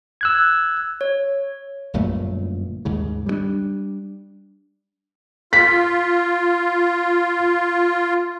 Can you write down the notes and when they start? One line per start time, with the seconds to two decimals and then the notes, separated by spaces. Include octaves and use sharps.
0.21 E6 F#6 G#6
1.01 C#5
1.94 G1 F#2 A#2 A3
2.85 D#2 G#2 C#3
3.26 G3 G#3 D4
5.53 F4 B6